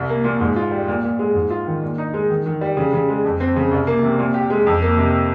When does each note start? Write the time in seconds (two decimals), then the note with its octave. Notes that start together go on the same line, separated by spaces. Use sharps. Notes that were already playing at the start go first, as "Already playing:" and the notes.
Already playing: C2
0.09 A#3
0.24 A#2
0.40 G#2
0.56 F4
0.71 G3
0.88 A#2
1.03 A#2
1.19 G#3
1.35 G#2
1.50 F4
1.67 D#3
1.82 A#2
1.98 D#4
2.14 G#3
2.30 D#3
2.46 D#3
2.61 G3
2.77 C#3
2.93 C#3
3.09 G#3
3.24 F2
3.40 C4
3.56 C#3
3.71 C2
3.87 A#3
4.03 C3
4.19 A#2
4.34 G4
4.50 G#3
4.66 F2
4.82 A#3
4.98 C3